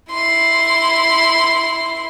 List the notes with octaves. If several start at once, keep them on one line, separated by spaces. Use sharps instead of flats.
E4 C6